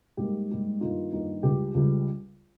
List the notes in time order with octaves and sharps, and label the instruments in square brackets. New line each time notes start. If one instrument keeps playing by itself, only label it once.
[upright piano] G#2 G3 A#3 G4
G#2 G3 A#3
G2 D#3 G3 A#3 D#4 F4
G2 D#3 G3 A#3 D#4
C#2 C#3 G3 G4
C#2 C#3 G3